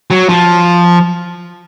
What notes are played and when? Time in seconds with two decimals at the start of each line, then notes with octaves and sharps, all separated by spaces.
0.11 F#3
0.29 F3